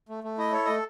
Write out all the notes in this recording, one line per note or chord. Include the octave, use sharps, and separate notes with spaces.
A3
A3
E4 D#5
A4 C#5
A3 D#5